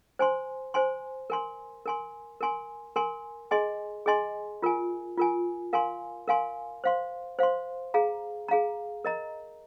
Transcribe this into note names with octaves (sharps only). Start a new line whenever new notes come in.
C5 G#5 C6
C5 G#5 C6
A#4 G#5 C6
A#4 G#5 C6
A#4 G#5 C6
A#4 G#5 C6
G#4 D#5 G#5 C6
G#4 D#5 G#5 C6
F4 A#4 G#5
F4 A#4 G#5
A#4 F5 G#5 C6
A#4 F5 G#5 C6
C5 F5 C6
C5 F5 C6
G#4 F5 A#5
G#4 F5 A#5
A#4 D#5 A#5